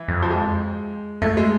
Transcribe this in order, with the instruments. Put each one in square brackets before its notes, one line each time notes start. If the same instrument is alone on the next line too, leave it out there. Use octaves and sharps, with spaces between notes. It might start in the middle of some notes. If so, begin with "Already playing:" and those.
Already playing: [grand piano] E3
[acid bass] F2
[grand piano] F3
G#3
[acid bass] F2 [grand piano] A3
[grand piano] G#3